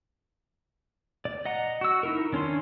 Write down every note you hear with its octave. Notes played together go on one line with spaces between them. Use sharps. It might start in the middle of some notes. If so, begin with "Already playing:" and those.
D5
D#5 F#5 A#5
F#4 E6
D#4 E4 A#4
D#3 C#4 D4 C6